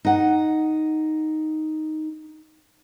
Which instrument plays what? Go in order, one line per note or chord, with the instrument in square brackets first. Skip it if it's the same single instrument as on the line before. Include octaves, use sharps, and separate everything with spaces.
[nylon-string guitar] D#4 F#5